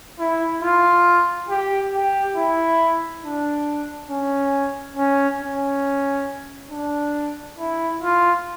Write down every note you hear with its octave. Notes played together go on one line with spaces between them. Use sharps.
E4
F4
G4
G4
E4
D4
C#4
C#4
C#4
D4
E4
F4